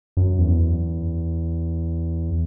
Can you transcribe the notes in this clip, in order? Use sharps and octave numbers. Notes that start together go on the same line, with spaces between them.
F#2
E2